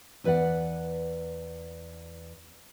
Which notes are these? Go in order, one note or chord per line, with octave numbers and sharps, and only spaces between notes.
E2 B4 C5 D5 F#5